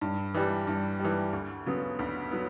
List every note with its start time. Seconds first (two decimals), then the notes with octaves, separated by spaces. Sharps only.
0.01 G2
0.34 E3 G3
0.67 G2
1.00 E3 G3
1.33 D2
1.66 C#3 F#3 B3
1.99 D2
2.31 F#3 B3